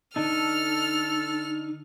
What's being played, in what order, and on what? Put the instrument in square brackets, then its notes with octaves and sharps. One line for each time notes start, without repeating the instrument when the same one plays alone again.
[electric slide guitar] D3 D4 D#4 [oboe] A4 [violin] F6